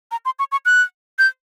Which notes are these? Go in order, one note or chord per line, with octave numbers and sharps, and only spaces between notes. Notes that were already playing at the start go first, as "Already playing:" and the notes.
A#5
C6
C#6
C#6
F#6
G6